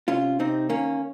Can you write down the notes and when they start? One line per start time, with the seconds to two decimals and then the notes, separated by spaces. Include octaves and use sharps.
0.08 C3 C#4 F4
0.39 C3 C4 D#4
0.69 D#3 A#3 C#4